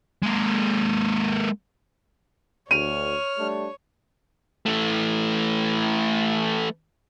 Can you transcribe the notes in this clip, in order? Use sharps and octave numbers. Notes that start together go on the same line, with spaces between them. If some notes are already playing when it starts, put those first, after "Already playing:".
G#3 A#3
D2 C#5 F6 D#7
G3 A3 D4
E3 A3